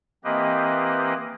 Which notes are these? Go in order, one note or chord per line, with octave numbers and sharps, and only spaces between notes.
E3 A#3 C4 G4 B4 D#5